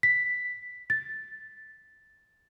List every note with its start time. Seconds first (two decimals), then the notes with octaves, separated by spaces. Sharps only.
0.03 B6
0.90 A6